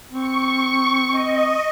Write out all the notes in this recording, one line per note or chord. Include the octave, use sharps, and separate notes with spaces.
C4 C#6
D#5